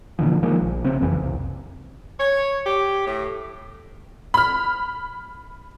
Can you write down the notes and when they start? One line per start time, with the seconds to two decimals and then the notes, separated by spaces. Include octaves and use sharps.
0.19 A#2 D3 E3 F3
0.43 D#3 F3 G#3 A#3
0.61 A#1
0.84 C#3 C4
1.01 F#1 F2 C#3 E3
1.23 C2
2.19 C#5
2.66 G4
3.07 A2
4.34 B5 F6